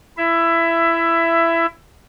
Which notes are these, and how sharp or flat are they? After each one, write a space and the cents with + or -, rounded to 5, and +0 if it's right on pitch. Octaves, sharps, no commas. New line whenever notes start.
E4 +20 E5 +15